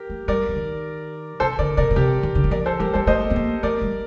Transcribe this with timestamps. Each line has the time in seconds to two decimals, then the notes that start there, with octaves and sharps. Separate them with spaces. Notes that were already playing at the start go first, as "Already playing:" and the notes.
Already playing: G4 A#4
0.10 A3
0.28 G3 A#4 D5
0.49 F3
0.56 D#3
1.40 C3 A4 C5
1.59 D3 A#4 D5
1.77 C3 A#4 D5
1.91 A#2
1.96 C3 G4 A#4
2.23 D#3
2.35 D3
2.44 D#3
2.51 F3 A#4 D5
2.66 A4 C5
2.79 G3 G4 A#4
2.93 G3 A4 C5
3.07 A3 C5 D#5
3.30 C4
3.36 A#3
3.63 A3 A#4 D5
3.82 G3